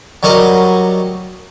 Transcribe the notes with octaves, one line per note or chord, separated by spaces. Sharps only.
F#3 G3 A#4 D#5